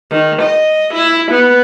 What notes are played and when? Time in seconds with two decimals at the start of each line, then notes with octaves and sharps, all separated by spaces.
0.11 D#3
0.42 D#5
0.94 E4
1.31 B3